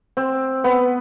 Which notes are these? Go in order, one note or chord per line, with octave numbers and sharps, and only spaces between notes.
C4
B3